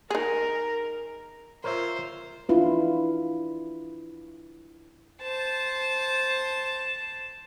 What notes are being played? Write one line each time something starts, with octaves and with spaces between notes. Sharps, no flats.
D#4 G#4 A#4
F4 A#4 C5 C#5 E5
D4 E4 F4 B4
C5 A5